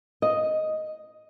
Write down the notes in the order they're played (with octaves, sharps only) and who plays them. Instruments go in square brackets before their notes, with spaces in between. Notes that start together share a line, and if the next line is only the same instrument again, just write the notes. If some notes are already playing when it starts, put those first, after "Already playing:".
[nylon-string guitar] D#5